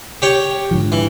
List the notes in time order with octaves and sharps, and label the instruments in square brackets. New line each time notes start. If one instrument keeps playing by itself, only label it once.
[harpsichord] G4 C#5 G5
[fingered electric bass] G#2 D3 F3
[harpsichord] E3